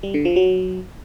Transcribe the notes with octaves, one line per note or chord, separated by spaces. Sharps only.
G3
D3
F3
F#3